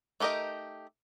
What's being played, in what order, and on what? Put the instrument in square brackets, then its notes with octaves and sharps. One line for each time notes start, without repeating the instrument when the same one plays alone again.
[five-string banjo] A3 D#4 G4 A#4 D#5